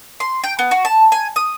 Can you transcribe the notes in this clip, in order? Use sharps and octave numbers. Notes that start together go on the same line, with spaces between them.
C6
G5
B3
F#4
A5
G#5
D#6